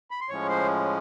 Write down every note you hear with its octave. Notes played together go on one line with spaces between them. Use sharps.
B5
C6
A2 F3 G#3 C#4 C#5 C#6
C5 C6